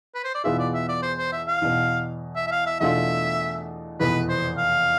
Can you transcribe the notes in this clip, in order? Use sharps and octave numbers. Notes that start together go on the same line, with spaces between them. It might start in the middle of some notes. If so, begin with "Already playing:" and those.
B4
C5
D5
E2 B2 B3 F4 G#4 E5
D5
E5
D5
C5
C5
E5
F5
E2 B2 B3
E5
E5
F5
E5
E2 B2 A3 D4 F4 E5
F1 E2 B2 B3 B4
C5
F5